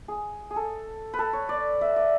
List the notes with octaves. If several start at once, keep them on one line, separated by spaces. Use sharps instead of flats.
G#4
G#4
A4
B4
A4
C#5
D5
E5
D5